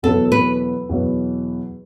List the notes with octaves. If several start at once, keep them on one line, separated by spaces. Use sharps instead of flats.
E2 B2 F#3 B3 A4
B4
E2 B2 F#3 B3